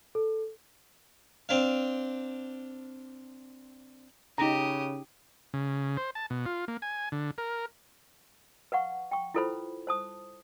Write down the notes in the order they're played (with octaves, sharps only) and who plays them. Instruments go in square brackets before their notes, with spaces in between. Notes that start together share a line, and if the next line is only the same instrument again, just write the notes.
[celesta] A4
[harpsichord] C4 D4 F5
[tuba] C#3 [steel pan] D#4 A#5 [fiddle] G4 D#6
[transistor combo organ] C#3
C5
A5
B2
F4
A#3
G#5
D3
A#4
[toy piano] B4 F5 F#5 C#6
G5 C#6
E4 F4 A4 B4 C5 B5
C5 A5 D#6